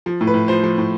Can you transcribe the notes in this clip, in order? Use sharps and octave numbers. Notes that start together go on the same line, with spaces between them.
F3
A2
B4
A2
F3 C5
F3
A2